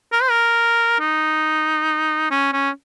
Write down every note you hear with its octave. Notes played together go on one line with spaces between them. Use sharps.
A#4
C5
A#4
D#4
C#4
C#4